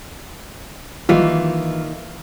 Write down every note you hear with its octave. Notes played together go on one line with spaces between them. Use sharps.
A1 D#3 E3 F#3 G3 A#3 D#4 F4